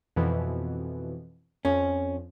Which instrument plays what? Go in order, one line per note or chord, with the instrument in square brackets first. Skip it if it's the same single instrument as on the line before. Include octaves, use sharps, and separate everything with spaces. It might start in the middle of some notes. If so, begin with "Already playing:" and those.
[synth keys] F2 B2 E3
[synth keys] F2 [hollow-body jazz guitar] C#4